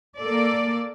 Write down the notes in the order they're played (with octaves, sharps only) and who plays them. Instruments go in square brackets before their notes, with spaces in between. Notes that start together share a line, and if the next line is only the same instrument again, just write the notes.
[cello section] A#3 A4 D5